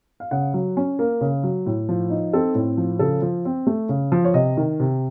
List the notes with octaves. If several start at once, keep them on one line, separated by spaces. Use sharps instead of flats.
F5
C#3 F#5
F#3
C#4
A#3
C#3
F#3
A2
F3
D#4
C4 A4
A2
F3
C#3 A4
F3
C4
A3
C#3
F3
C#5
C3 D#5
D#3
C3